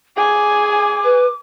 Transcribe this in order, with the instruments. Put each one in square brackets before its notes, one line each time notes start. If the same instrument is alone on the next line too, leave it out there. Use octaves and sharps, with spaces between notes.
[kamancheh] G#4 G#5 [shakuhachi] D6
[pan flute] B4